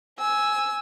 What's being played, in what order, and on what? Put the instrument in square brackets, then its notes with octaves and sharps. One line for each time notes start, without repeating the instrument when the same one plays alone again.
[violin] G#5 E6